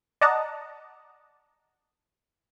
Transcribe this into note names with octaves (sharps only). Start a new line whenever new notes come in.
D5 D#5 F#5 A5 A#5